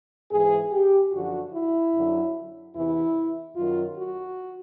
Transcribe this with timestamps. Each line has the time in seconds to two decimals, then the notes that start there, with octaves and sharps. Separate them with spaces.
0.31 G#2 E3 G#4
0.72 G4
1.13 F#2 D3 F3 F#4
1.53 E4
1.94 F#2 D3 F#3
2.75 E2 C3 E3 E4
3.56 F#2 D#3 F#3 F4
3.97 F#4